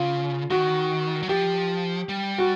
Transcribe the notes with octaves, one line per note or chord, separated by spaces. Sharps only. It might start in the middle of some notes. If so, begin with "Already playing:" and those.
Already playing: C#3 F4
D#3 F#4
F#3
F3 G4
G3
F#4